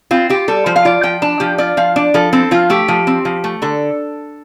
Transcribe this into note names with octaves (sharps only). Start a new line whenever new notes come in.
C4 F4
F4 G4
G3 A4
F3 C5
F5
F4 D5
F3 G5
D4 A5
F3 G4
F4 D5
F3 F5
D4 D5
F3 A4
C4 A4
F3 F4
A3 G4
F3
C4
F3
A3
D3 A4